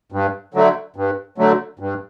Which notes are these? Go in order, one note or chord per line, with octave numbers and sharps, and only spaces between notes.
G2
D3 F#3 A3
G2
D3 F#3 A3
G2